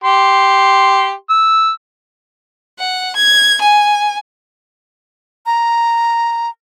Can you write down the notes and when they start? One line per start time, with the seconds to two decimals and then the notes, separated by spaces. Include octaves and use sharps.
0.04 G4 C6
1.29 E6
2.80 F#5
3.15 G#6
3.60 G#5
5.46 A#5